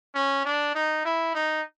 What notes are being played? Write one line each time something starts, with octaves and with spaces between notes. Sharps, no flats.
C#4
D4
D#4
E4
D#4